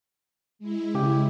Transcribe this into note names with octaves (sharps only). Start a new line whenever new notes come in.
G#3 E4
C#3 G4